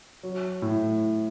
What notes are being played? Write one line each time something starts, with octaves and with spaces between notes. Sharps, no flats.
F#3
A2